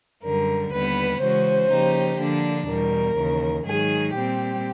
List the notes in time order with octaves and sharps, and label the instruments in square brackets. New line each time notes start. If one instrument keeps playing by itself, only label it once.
[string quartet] F#2 D3 G3 [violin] A#4
[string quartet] D#2 D3 G3 B3 [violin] B4
[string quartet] C#3 E3 G#3 C#4 F#4 [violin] C5
[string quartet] C#3 F3 A#3 D#4 G4
D3 F3 A#3 D4
[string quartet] E2 B2 G3 [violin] A#4
[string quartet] D#2 C#3 E3
[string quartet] G#2 D#3 F#3 [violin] G#4
[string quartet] A#2 G3 C4 [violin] G4